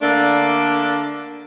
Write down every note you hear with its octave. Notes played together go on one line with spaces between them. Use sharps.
D3 A3 A#3 D4